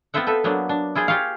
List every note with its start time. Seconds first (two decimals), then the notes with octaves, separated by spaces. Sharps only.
0.14 B3 C4 F4 C5 E5 F#5
0.27 A4 B4 E5
0.44 F#3 A#3 B3 D4
0.69 D4
0.95 E4 F4 G#4 C5
1.08 F4 G4 G#4 C#5 F5